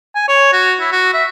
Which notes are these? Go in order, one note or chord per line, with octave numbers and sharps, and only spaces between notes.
G#5
C#5
F#4
E4
F#4
E5